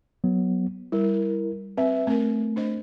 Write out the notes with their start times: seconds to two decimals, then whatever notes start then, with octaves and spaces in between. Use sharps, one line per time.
0.24 F#3 B3
0.92 G3 E4 A#4
1.77 C4 B4 E5
2.07 A3 C4 A#4
2.56 D4 C5 D#5